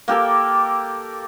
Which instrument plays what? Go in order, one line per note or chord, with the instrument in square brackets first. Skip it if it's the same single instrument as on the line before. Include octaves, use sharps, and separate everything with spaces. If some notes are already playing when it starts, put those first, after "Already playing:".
[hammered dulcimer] A#3 G4 A4 A#4